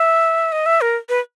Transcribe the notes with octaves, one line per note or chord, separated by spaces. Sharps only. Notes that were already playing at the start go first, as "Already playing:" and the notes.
Already playing: E5
D#5
E5
A#4
B4